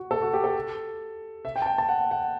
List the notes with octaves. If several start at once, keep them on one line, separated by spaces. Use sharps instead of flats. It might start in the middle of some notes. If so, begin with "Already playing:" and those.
Already playing: F#4
A4
F#4
G4
A4
E5
G5
A5
G5
A5
F#5
F#5